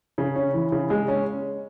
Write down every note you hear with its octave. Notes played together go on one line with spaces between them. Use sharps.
C#3
C#4
E3
C#3
G#3
C#4